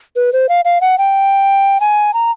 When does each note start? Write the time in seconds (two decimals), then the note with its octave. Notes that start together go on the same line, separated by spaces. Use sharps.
0.16 B4
0.33 C5
0.49 F5
0.65 F5
0.81 F#5
0.98 G5
1.80 G#5
2.14 A#5